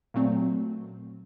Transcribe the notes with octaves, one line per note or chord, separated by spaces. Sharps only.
A#2 F#3 A3 C4